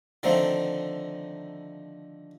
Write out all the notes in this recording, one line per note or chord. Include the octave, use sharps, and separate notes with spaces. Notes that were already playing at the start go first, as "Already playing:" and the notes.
D3 D#3 F3 A3 C4